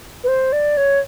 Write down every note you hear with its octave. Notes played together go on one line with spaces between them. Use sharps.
B4
C5
D5
C#5